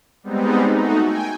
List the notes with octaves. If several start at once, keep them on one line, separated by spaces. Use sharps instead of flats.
G3 G#3 B3 C4 D#4
A3 D#4 F#4
G5 G#5